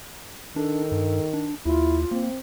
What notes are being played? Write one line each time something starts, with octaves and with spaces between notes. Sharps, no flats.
D#3 D4 A4
G2
D4
D#2 E4 F4
A#3 C4